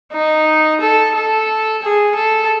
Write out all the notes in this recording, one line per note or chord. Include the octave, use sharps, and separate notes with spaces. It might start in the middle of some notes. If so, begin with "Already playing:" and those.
D#4
A4
A4
G#4
A4